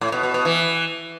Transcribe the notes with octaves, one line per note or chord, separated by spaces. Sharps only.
A2
B2
B2
B2
E3